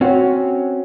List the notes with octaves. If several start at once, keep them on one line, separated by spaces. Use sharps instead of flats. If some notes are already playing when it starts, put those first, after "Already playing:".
C4 C#4 F#4